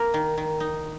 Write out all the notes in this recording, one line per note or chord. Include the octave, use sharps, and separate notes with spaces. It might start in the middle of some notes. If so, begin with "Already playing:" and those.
Already playing: A#3 A#4
D#3
D#3
D#4